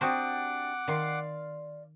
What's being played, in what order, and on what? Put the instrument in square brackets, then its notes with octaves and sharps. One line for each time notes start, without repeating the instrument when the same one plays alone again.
[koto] C4 F#4 C5 [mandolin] D4 G4 D#6 [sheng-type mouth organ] F#5 D6
[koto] D#3 [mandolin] D5 F5 C6